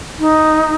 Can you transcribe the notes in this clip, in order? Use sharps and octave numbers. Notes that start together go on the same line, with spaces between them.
D#4